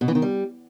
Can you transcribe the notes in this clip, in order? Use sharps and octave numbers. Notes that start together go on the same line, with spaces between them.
B2
E3
D#3
G3